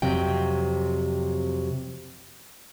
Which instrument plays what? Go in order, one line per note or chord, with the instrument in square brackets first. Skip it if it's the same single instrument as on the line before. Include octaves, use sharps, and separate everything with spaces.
[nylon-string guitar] F2 C3 F#3 G5